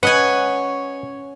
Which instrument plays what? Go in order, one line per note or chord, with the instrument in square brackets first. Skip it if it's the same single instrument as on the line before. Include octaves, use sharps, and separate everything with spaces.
[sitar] C#4 [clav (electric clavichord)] B4 D#5 [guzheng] F#5 G#5